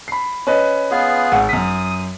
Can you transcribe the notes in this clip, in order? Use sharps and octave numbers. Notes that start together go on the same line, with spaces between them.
B5 C7
C#4 B4 D#5
B3 F4 G#4
G#1 F#5
F#2 D#6 B6